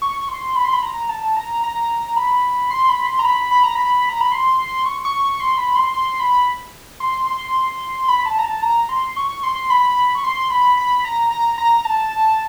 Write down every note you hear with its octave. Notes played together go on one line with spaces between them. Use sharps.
C#6
C6
B5
C6
B5
A#5
A5
A#5
A#5
B5
C6
B5
C6
A#5
B5
B5
A#5
B5
A#5
B5
C6
C#6
C#6
C6
B5
C6
C6
B5
C6
C6
B5
A5
A#5
A5
A#5
C6
C#6
C6
B5
C#6
C6
B5
B5
A#5
A#5
A#5
A5